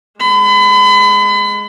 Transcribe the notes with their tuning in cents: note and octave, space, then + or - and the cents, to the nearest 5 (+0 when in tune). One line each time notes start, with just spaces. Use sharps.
G#3 +0 B5 +35